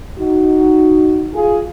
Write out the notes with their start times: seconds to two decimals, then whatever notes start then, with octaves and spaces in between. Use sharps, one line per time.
0.18 D#4 F#4
1.34 F4 G#4